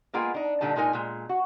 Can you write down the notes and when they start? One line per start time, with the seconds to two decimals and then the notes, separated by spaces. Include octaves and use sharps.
0.13 G#3 A#3 B3 F4 G#4 G5
0.34 D4 D#4
0.61 A#2 D3 G3 D#4 A5
0.76 A#2 G#3 D#4 A#4 G#5
0.93 A#2 G#3
1.29 F#4